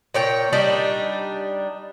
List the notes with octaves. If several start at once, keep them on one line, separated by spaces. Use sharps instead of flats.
A#2 C#5 G5
G3 D4 D#4